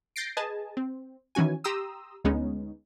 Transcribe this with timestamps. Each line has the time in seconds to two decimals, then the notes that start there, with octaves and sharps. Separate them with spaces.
0.16 G6 A6 A#6 C7 D7
0.37 G#4 B4 D#5 G#5 A5
0.77 C4
1.35 D#3 E3 C#4 F#4 G#5
1.64 G4 A#5 C6 D#6 E6
2.24 D2 G#3 B3 C#4 D#4